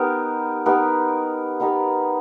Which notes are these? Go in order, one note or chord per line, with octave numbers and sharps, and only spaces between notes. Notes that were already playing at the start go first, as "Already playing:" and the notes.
Already playing: B3 D#4 G4 A#4
B3 D#4 G4 A#4
B3 D#4 G4 A#4